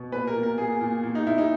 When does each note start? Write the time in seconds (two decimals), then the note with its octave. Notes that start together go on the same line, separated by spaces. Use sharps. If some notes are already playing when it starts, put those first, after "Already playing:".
Already playing: B2
0.12 A#2 B4
0.27 A#4
0.35 A#2
0.43 A#4
0.58 A#2 G#4
0.81 A#2
1.03 A#2
1.15 D#4
1.27 A#2 E4
1.38 D#4